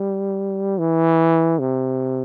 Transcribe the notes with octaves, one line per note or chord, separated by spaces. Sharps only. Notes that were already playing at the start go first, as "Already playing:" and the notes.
Already playing: G3
E3
C3